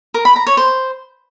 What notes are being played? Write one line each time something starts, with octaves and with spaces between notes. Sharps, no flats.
A#4
B5
A#5
C#5
C5